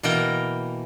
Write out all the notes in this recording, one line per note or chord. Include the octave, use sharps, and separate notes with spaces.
B2 E3 A#3 A#4 G5 A#5